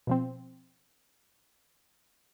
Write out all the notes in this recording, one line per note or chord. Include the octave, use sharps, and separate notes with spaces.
B2 F3 C4